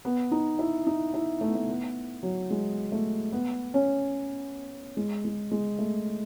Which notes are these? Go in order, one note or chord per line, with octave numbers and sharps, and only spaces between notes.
B3
D#4
E4
D#4
E4
A3
B3
A3
B3
F#3
G#3
A3
B3
C#4
G#3
G#3
G#3
A3